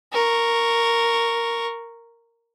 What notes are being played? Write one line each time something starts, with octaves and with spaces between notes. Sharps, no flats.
A#4 C#6